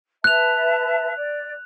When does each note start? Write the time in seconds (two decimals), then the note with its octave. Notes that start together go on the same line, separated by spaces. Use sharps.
0.24 B4 E5 A5 F#6 F7
1.16 D5